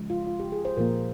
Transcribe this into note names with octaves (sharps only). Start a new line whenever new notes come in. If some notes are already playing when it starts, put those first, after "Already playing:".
Already playing: C#3 F3 G#3
F4
F4
G4
G#4
C5
A#2 F3 A#3 A#4